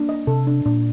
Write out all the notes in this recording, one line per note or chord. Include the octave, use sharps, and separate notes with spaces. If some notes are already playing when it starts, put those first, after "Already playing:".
Already playing: A#3 D4
D#5
C3 A4
D4
A#2 D4